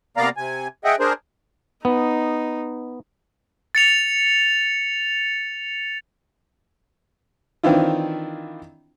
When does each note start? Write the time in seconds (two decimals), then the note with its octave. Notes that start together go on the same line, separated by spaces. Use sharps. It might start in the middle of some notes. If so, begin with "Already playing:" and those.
0.17 C3 A#3 B3 D5 F5 A#5
0.37 C3 G#5
0.84 G#4 D#5 E5 F#5 G5
1.00 D4 G#4 A#4 C5
1.85 B3 D#4
3.75 A6 C#7 F7
7.63 D#3 E3 C4 D4 E4 F4